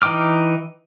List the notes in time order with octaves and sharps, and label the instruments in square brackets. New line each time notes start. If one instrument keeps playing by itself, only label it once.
[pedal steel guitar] E3 D#4 G5 D6 F6